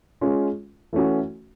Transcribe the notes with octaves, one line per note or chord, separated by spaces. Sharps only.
G#3 C#4 F4
E3 A3 C#4 F#4